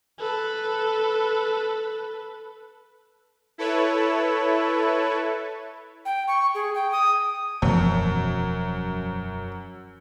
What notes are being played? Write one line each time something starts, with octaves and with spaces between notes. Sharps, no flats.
A4 B4
E4 A4 B4 C#5
G5
C#6
G#4
G5
D#6
E1 F#2 F3